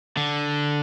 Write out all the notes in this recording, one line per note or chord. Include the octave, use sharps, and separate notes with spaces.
D3